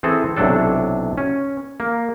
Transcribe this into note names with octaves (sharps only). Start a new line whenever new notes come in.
E3 C4 G#4 A4
B1 C3 E3 F#3 D4 A4
C#4
A#3